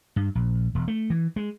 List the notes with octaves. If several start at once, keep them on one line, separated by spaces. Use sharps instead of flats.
G2
A#1
E1
A3
E3
G#3